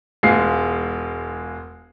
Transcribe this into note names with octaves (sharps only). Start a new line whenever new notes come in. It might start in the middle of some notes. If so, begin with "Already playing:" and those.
E1 G#3 F4 C7